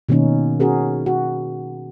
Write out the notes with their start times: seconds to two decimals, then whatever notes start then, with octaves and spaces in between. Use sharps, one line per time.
0.09 B2 D#3 A#3 C#4 D#4
0.60 C#4 F#4 G#4 A#4
1.06 F#4